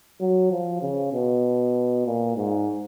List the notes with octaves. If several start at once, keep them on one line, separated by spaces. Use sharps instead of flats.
F#3
F3
C#3
B2
A#2
G#2